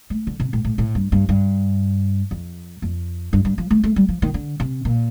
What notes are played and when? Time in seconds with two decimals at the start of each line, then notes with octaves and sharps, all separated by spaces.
0.10 A3
0.27 D3
0.40 C3
0.53 A2
0.65 A2
0.78 A2
0.95 G2
1.12 G2
1.29 G2
2.31 F2
2.82 F2
3.33 G2
3.45 G2
3.58 F3
3.71 A3
3.83 A3
3.96 G3
4.09 F3
4.22 D#3
4.34 D3
4.60 C3
4.85 A#2